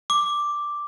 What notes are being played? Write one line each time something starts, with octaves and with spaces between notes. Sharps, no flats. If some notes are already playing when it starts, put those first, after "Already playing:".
D6